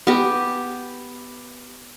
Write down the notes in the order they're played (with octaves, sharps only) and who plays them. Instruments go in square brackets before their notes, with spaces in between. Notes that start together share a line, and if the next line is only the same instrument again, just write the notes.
[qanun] B3 G4